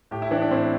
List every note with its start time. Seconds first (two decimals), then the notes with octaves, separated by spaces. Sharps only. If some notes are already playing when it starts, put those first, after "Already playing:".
0.11 A2 G4
0.22 E4
0.31 E3 D4
0.42 D4
0.51 A2 C4